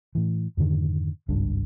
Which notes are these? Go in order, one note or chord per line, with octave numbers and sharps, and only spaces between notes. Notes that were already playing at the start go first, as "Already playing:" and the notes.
A2 E3
F2 G#2 D3 D#3
G#1 C#2 G2 D4